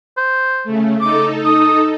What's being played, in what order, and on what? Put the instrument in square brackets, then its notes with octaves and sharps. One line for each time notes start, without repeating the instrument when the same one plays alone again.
[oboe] C5
[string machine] C#3 A3
[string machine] D#4 A4 [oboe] D6
[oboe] D#6